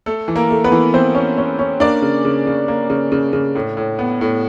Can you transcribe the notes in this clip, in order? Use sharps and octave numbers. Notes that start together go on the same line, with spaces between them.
A3 A4
E3
A#3 A#4
A3
B3 B4
E3
E3 C4 C5
C#4
C#4
C#4
A#3 D4 D5
C#3
C#3
C#3
A#3
C#3
C#3
C#3
A2
A2
B3
A2